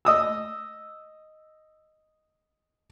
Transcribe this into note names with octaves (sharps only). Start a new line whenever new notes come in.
D#5 D#6 E6